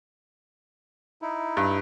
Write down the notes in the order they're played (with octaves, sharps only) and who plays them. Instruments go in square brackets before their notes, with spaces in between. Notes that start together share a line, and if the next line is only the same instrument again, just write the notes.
[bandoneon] D#4 E4
[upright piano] G2